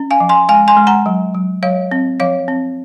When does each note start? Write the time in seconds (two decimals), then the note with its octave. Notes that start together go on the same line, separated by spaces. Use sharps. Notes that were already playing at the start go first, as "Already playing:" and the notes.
Already playing: C#4
0.11 F5 G#5
0.20 F3
0.29 G#5 C6
0.49 G#3 F5 G#5
0.68 G#5 C6
0.77 G#3
0.87 F#5 A#5
1.06 F#3
1.34 F#3
1.63 F#3 C#5 F5
1.91 C4
2.20 F3 C#5 F5
2.48 C4